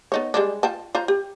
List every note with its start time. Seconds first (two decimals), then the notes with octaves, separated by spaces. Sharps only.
0.12 B3 D#4 C#5
0.34 G3 G#3 D4
0.63 F4 G5 A5
0.95 F4 C5 A#5
1.08 G4